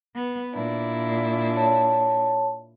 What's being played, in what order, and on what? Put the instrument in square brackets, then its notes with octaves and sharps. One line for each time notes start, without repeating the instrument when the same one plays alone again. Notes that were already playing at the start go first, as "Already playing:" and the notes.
[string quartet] B3
A#2 D4 E4
[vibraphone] C#5 A5